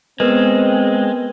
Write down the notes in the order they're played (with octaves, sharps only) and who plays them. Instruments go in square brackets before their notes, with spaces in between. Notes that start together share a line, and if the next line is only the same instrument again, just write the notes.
[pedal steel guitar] G#3 [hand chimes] B3 A#4 B4 [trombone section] C4